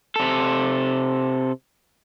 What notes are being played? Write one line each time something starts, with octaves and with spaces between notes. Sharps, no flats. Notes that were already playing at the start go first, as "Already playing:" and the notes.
C3 A4